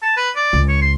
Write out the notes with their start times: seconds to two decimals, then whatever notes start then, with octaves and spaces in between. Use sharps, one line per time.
0.03 A5
0.17 B4
0.36 D5
0.53 C#2
0.69 C#5
0.82 C6